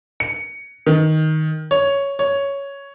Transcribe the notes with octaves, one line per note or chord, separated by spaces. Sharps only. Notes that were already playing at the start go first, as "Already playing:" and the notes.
C#7
D#3
C#5
C#5